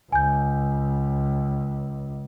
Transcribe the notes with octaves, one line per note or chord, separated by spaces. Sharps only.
C#2 G#5 G6